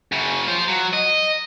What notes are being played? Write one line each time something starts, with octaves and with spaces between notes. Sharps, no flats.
F#2 C#3
F4 C5
F#3
D#5